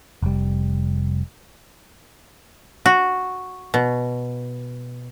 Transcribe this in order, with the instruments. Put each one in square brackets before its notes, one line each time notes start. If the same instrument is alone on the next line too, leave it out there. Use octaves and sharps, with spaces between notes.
[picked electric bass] F1 G3
[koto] F#4
B2